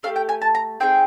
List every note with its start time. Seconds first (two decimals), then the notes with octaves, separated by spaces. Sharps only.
0.03 A3 D4 G4 F5
0.16 G5
0.29 G#5
0.42 A5
0.55 A#5
0.80 C4 D#4 G#4 G5